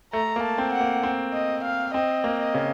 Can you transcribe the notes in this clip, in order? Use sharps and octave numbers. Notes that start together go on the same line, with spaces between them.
A3 A#5
A#3
A5
C4
F#5
A#3
C4
D#5
F5
C4 D#5
A#3
D#5
C#3